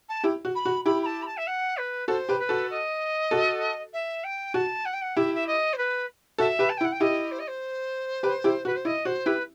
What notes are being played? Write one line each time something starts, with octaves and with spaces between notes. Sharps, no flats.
A5
E4 G4
F#4
B5
F#4
E4 G4 B5
B5
A5
B5
A5
E5
F#5
B4
F#4 A4 C5
G4 B4
B4
F#4 A4
D#5
F#4 A4
E5
G5
F#4 A5
F#5
G5
F#5
E4 G4 E5
E5
D#5
C5
B4
F#4 A4 E5
G4 B4
A5
G5
E4
F#5
G5
E4 G4 D#5
C5
D#5
C5
G4 B4
E4 G4
F#4 B4
C5
E4 D#5
F#4 C5
E4 G4 B4